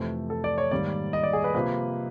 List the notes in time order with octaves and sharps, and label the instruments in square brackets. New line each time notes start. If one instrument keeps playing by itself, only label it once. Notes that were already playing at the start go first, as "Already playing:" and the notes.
Already playing: [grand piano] F2 C3 E3 A3
A4
D5
C#5
G#2 D#3 G3 A#3 D5
D#5
D5
G#4
B4
C3 F3 A#3 B4